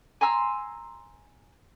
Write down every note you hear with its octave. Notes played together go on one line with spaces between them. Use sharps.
G#5 A#5 C6 E6